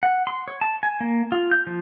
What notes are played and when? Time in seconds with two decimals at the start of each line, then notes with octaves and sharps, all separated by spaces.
0.03 F#5
0.27 C6
0.48 C#5
0.61 A5
0.83 G#5
1.01 A#3
1.32 F4
1.51 G6
1.67 F3